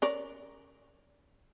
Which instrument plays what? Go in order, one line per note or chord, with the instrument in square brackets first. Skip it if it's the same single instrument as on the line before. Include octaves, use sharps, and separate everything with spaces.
[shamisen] C#4 A#4 D5